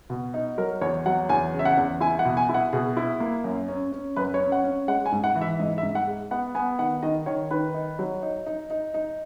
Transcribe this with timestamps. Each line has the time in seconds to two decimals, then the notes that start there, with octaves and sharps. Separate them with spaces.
0.10 B2
0.34 D#4
0.58 F#3 A#4
0.81 E2 C#5
1.06 F#3 F#5
1.29 E2 G#5
1.54 C#3
1.59 E5
1.65 F#5
1.77 E2
2.01 E4 G#5
2.19 F#5
2.25 B2
2.37 G#5
2.49 E4
2.54 F#5
2.73 B2 G#4
2.97 E4
3.20 A#3
3.44 F#2
3.68 C#4
3.92 C#4
4.16 F#2 B4
4.34 C#5
4.40 C#4
4.52 F#5
4.64 C#4
4.88 G#3 F#5
5.06 G#5
5.12 G#2
5.24 F#5
5.36 E3
5.42 E5
5.59 G#2 D#5
5.78 E5
5.83 G#2
5.95 F#5
6.07 G#3
6.31 B3 F#5
6.55 B3 G#5
6.79 D#3 F#5
7.03 D#3 D#5
7.26 D#3 C#5
7.51 D#3 B4
7.74 D#4
7.99 F#3
8.23 D#4
8.46 D#4
8.70 D#4
8.94 D#4